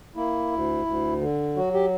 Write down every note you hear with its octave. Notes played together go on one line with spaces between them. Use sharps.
A#3 E4
D2
D2
D3
F#3 F#4
G4